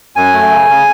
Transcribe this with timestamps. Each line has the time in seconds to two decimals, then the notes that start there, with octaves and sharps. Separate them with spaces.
0.16 F#2 G#5
0.34 A3
0.51 C#3
0.69 C#3